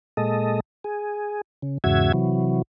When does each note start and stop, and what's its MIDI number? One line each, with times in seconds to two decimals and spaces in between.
0.17 0.60 46
0.17 0.60 56
0.17 0.60 69
0.17 0.60 75
0.84 1.41 68
1.62 1.78 49
1.84 2.12 40
1.84 2.12 44
1.84 2.12 49
1.84 2.12 66
1.84 2.12 76
1.84 2.12 92
2.13 2.62 48
2.13 2.62 52
2.13 2.62 54